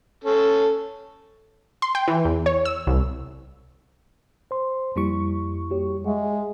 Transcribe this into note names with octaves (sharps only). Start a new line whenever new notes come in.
C#4 A4
C6
G5
E3
E2
C#5
E6
C2
C5 C6
F2 G3 A#3 E4 C#6
F#4 G4 C#5
G#3 E5 F#5